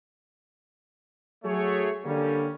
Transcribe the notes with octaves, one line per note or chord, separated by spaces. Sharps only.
F#3 A3 G#4 C#5
D3 G3 A#3 C#4